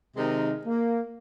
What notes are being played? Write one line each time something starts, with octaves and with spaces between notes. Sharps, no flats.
C3 D#3 G#3 D#4 A#4
A#3